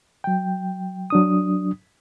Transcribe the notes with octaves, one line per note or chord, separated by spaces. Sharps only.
F#3 G5
F#3 D4 D#6